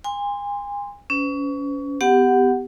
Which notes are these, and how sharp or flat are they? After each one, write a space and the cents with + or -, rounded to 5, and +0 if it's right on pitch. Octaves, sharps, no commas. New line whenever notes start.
G#5 -35 C6 -5
C#4 +25 B4 +45
B3 +30 G4 +0 F#5 +0